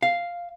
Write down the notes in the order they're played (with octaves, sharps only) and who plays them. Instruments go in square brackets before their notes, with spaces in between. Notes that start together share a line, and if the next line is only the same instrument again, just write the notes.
[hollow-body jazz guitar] F5